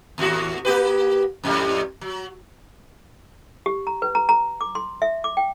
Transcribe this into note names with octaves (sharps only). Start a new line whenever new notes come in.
D#2 A2 F#4
A#3 G4 B4
F2 A2 G3
F#3
G4
A#5
B4
A#5
A#5
D6
C6
E5
D6
G5